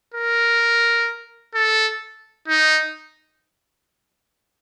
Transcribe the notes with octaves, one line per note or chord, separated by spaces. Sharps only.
A#4
A4
D#4